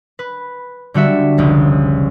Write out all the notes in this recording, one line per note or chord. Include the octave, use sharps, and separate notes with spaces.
B4
D3 G3 F#4 E5
F1 C#2